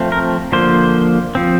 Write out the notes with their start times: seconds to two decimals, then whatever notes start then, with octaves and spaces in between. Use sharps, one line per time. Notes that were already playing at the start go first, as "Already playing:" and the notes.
Already playing: F3 A3 C4
0.12 A#4
0.52 D3 F3 A#3 C5
1.35 F3 C4